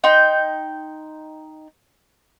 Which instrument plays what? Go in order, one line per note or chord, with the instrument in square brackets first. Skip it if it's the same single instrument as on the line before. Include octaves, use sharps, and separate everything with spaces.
[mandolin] D#4 G5 C6